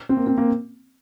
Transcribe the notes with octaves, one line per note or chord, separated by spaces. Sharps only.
C4
A#3
C4
A#3